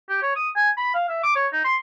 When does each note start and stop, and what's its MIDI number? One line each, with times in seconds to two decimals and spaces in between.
0.09 0.21 67
0.22 0.36 73
0.36 0.50 87
0.56 0.70 80
0.78 0.90 83
0.94 1.05 77
1.09 1.23 76
1.24 1.35 86
1.35 1.47 73
1.53 1.62 63
1.65 1.76 84